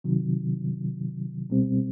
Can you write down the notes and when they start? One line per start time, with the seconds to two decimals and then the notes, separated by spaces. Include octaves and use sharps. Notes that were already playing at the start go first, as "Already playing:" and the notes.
0.04 C3 D#3 F#3
1.50 C#2 B2 G3 C4